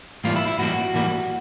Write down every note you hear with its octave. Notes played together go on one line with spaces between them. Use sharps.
A2 E3 G3 A#3 F4
E4
E4
A2 E3 G3 A#3 F#4
A2 E3 G3 A#3